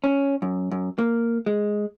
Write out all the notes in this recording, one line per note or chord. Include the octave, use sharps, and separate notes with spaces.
C#4
F#2
F#2
A#3
G#3